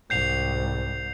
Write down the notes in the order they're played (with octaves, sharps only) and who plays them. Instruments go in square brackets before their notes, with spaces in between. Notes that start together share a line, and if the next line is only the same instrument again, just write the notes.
[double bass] C2 G#2 [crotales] G6 C7 F7